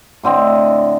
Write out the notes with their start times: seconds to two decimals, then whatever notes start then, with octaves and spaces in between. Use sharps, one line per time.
0.23 A2 D3 C4 D#5